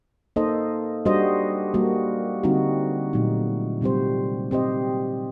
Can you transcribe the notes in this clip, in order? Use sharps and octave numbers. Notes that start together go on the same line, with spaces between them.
A#3 D#4 A4 C5 D#5
G3 D4 F#4 C5 D#5
G3 A#3 F#4
D3 G3 C4 D#4 F#4
A#2 F#3 A3 D#4
C3 G3 C4 G4 C5
C4 G4 C5 D#5